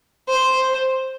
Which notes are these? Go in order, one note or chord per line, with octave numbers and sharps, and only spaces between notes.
C5